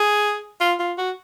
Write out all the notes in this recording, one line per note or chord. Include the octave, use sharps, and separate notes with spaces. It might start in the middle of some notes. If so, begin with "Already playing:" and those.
Already playing: G#4
F4
F4
F#4